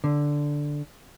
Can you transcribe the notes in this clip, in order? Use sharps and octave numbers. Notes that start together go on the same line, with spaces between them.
D3